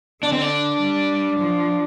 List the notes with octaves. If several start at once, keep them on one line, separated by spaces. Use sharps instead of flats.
D3 D4
C4
D4
G3
F3